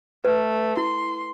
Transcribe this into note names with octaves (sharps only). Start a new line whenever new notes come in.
A3 B4
E4 C6